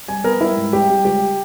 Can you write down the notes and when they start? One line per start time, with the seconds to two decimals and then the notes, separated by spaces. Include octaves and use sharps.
0.08 G3 G#5
0.24 B3 A#4
0.41 G3 E4
0.57 G#2
0.72 G3 G4
0.89 G3
1.05 C#2 G4